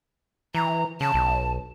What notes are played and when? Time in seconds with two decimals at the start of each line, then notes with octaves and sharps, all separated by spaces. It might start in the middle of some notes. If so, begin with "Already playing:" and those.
0.55 E3 A#5
1.01 C#3 A5
1.14 B1